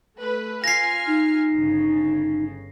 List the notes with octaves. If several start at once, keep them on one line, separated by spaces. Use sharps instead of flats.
A3 B4
F4 G#5 F6 A#6 C7
D#4
G1 C#3